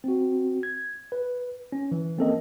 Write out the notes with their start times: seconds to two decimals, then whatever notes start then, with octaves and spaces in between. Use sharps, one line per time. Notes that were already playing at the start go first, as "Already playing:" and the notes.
0.04 C4 F#4
0.63 G#6
1.12 B4
1.72 C#4
1.91 E3
2.18 A#3 C4 C#4 A4 A#4 D#5